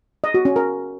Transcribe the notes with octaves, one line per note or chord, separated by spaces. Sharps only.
D#5
F#4
C#4
A#4